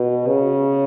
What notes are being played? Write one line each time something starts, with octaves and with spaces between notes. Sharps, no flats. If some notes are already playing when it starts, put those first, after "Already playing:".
Already playing: B2
C#3